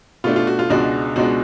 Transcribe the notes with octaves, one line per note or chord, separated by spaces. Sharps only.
B2 A3 D4 F4
F4
F#4
F4
C#2 B2 G#3 D4 F#4
C#2 B2 G#3 D4 F#4